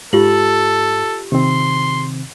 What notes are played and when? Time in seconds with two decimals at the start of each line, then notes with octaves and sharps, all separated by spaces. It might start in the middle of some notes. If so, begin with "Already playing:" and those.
0.13 G#2 F4 G4 A4 F#7
1.32 C3 D#3 C4 C6